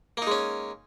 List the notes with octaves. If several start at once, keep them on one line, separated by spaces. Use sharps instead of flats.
G#3 A#3 C#4 D#4